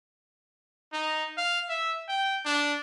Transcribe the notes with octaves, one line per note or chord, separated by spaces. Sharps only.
D#4
F5
E5
G5
D4